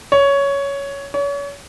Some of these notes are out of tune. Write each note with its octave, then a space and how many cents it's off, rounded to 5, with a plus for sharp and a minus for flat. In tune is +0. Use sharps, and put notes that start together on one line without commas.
C#5 +10
C#5 +35